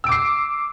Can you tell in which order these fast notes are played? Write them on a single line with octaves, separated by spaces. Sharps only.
E6 D7 D6 C7